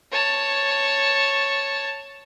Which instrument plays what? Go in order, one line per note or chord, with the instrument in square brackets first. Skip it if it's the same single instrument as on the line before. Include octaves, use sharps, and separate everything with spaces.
[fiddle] C#5 A5